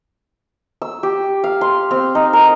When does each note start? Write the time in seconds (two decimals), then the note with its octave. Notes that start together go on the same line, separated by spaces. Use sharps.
0.82 E6
1.03 G4
1.44 F5
1.61 C6
1.91 C4
2.15 D#4
2.33 A#4